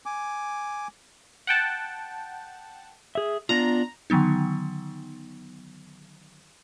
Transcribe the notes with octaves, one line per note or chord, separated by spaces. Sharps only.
G#5 D6
F#5 G5 A5
G#4 E5
B3 D4 F4 A#5
D3 D#3 F#3 B3 D#4